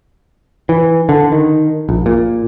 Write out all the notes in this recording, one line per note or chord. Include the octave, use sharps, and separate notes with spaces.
E3
D3
D#3
A#1
A#2